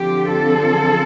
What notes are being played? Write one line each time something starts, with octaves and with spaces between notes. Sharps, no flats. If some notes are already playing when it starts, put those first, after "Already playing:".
Already playing: D3 F3 C4 F4 G4
A4